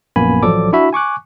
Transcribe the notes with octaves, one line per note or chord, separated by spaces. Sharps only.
A#1 F#2 A#3 B3 G#5 B5
A1 F3 F#3 A4 D5 D6
D4 E4 F#4 E5 B5
G#5 C#6 D6 F#6